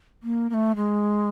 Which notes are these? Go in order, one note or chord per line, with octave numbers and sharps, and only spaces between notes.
A#3
A#3
A3
G#3